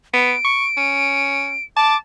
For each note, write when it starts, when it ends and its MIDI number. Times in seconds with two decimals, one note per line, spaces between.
0.13 0.33 59
0.13 1.64 98
0.45 0.65 85
0.77 1.55 61
1.76 1.95 81
1.76 1.97 86